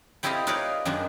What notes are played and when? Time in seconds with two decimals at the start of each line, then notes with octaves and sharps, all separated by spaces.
0.23 C4 E4 G4 A4 D#5 F5
0.47 D#4 F4 A#4 B4 C#5 D5
0.85 F#2 D#3 G#3 D4 D#4